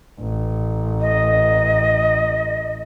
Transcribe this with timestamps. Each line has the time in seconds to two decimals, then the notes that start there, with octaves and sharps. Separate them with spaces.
0.20 A1
1.01 D#5